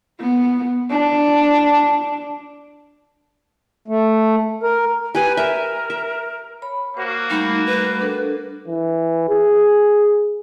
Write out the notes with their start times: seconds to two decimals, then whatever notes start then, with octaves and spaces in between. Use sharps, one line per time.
0.20 B3
0.90 D4
3.88 A3
4.63 A#4
5.15 G4 B4 G#5
5.37 A#4 E5
5.90 E5
6.62 C#5 B5
6.97 A#3 F#4 C5
7.30 G3 A3 D#4 B5
7.66 B4
8.00 D4 A4 A#4
8.67 E3
9.29 G#4